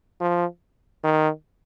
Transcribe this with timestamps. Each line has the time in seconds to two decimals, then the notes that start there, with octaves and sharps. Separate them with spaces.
0.21 F3
1.04 D#3